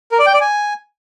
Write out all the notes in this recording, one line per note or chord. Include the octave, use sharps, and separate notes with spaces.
A#4
D5
G5
D5
G#5